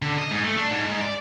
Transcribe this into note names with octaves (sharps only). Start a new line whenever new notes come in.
D3
D#5
G#2
A3
D4
G#2
G#2
D5